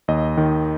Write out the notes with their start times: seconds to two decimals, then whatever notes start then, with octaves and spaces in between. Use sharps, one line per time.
0.08 D#2 D#5
0.37 D#3